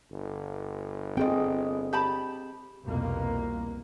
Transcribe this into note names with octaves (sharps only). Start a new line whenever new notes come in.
G1
C4 F4 G#4 D#5 G5
G4 A5 B5
C2 F2 B2 A#3